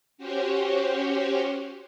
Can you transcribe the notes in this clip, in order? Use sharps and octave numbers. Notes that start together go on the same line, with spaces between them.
C#4 F#4 G4 C5 C#5